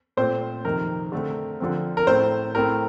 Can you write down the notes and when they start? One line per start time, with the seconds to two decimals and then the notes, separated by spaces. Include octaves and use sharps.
0.17 A#2 A3 C4 C5
0.65 F2 C3 D#3 A#4
1.12 D3 A3 C4
1.60 D3 F3 C4
1.97 A#4
2.07 A2 A3 C4 C5
2.55 A2 A3 C4 A#4